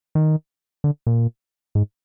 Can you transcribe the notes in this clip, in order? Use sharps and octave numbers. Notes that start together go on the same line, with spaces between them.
D#3
D3
A#2
G#2